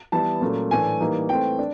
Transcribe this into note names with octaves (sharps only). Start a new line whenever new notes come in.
E3 G3 B3 E4 A5
A#2 F#3 A3 C#4
A2 E3 A3 D4 G#5
E3 G3 A#3 D#4
E3 A3 C4 G5
D4